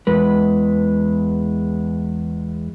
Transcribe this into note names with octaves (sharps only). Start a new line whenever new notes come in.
E2 G#3 B4